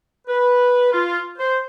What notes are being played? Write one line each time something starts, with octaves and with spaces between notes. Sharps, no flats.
B4
F4
C5